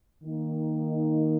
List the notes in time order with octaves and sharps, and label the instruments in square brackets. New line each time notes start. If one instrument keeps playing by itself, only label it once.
[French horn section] D#3 A#3 D#4